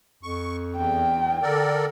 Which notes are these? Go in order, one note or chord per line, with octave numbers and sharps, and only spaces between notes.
F2 C#6
E2 G5
D3 A4 A#4 D5